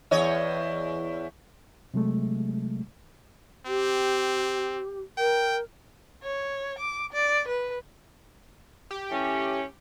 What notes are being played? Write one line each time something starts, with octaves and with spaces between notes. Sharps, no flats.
E2 C#5 D#5
C3 F#3 G#3 A3
C4 G4
A#4 G5
C#5
D6
D5
B4
G4
E3 A3 C#4